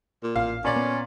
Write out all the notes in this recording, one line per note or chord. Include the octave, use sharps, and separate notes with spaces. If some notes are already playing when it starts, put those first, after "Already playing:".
A#2
A1 F5
A#2 C#4 D5
B3